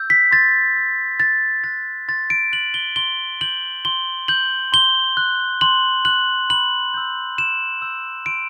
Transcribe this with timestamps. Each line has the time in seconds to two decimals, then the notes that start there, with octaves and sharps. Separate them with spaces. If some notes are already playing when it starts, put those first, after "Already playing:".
Already playing: E6 G6
0.10 B6
0.31 C6 A6
0.76 E6 G6
1.20 C6 A6
1.64 F#6 A6
2.08 C6 A6
2.30 D7
2.52 F#6 F#7
2.74 G7
2.96 C6 G7
3.41 G6 F#7
3.85 C6 G7
4.28 G6 F#7
4.72 C6 G7
5.17 F#6
5.61 C6 F#7
6.05 F#6 F#7
6.50 B5 F#7
6.94 E6 G6
7.38 B5 E7
7.82 E6 G6
8.26 C6 D7